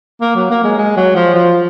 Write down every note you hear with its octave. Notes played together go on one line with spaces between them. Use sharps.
A#3
F#3
A#3
G#3
G#3
F#3
F3
F3